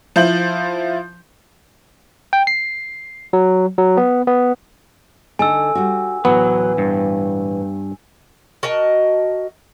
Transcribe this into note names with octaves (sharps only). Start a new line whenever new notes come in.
F3 E4 G6 F#7
G5
C7
F#3
F#3
B3
B3
D3 D#4 A4 G#5 E6
G3 F#4
D2 A2 E3 F#3 B3
G2
F#4 A#4 D#5 A5